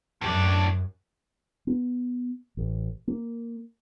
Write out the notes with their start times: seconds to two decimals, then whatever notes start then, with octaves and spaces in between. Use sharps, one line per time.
0.21 F#2 A2 D4
1.67 B3
2.57 A1
3.08 A#3